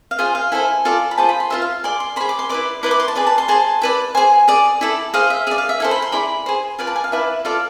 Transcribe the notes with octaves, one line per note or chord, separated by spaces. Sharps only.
F5
F4 G#4 C5 G#5
F5
E4 A4 C5 G#5
F4 A4 D5
B5
F4 G#4 C5 A5
B5
C6
F4 A4 C5 E5
F5
G#4 D5 C6
C6
G#4 C5 B5
D6
C6
E4 B4 D5 D6
E4 B4 D5 C6
D6
C6
A5
G#4 B4 D5
A5
C6
G#4 C5 A5
E4 B4 D5
G#4 C5 G#5
G#4 D5
E4 A4 D5
G#4 C5 F5
E5
G#4 D5 E5
F5
E5
E4 A4 C5 G#5
B5
C6
E4 G#4 D5 B5
G#4 C5
F4 B4 D5 G#5
A5
G#5
F5
E4 B4 D5 E5
F4 A4 D5 F5